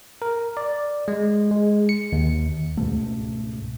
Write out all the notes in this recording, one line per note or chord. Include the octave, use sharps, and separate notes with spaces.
A#4
D5
G#3
G#3
C#7
D#2
C#2 G#2 B2 A3